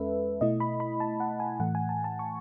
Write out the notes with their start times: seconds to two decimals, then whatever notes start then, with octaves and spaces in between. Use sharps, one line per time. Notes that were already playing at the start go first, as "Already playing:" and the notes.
Already playing: E2 G#3 C#4 A4 B4 E5
0.41 B2 A3 E4 D#5
0.60 B5
0.80 B5
1.00 A5
1.20 F#5
1.40 G#5
1.60 A2 E3 A3 F#5
1.75 G#5
1.89 A5
2.04 A5
2.19 C#6